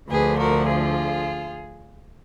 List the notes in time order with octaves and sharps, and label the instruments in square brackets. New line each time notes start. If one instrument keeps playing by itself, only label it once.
[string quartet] D2 D3 F3 G#4 B4
F#4 A#4
F4 G#4